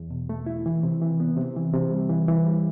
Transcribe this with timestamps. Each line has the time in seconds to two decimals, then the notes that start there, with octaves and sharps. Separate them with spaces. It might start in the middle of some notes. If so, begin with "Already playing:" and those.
Already playing: E2
0.10 B2
0.29 A3
0.46 E4
0.66 E3
0.83 C3
1.02 E3
1.20 B3
1.37 C3
1.56 E3
1.74 C3
1.92 G3
2.09 E3
2.28 E3
2.46 G3